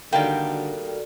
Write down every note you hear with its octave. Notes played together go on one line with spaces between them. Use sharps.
D3 D#3 G3 A#3 F#4 A4 D5 G5